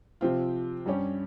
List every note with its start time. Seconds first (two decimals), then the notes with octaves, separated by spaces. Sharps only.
0.21 C3 F3 C4 F4
0.86 G2 G3 C#4 G4 C#5